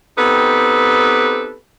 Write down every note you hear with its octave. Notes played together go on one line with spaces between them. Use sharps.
B3 C4 D#4 G4 A4 B4